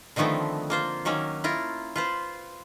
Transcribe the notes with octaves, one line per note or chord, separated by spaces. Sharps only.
D3 D#3 F3 A3 B3 C4
A#3 F4 C5
D#3 F#3 A#3 C#4
E4 F4 A#4
F4 B4 C5